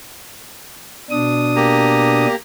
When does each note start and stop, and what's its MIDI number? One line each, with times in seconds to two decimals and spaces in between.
1.11 2.27 47
1.11 2.27 62
1.11 2.27 87
1.56 2.35 58
1.56 2.35 67
1.56 2.35 82